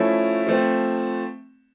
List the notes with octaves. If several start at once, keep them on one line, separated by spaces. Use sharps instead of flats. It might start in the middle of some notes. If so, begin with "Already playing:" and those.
Already playing: F3 A3 C#4 E4
F3 A3 C4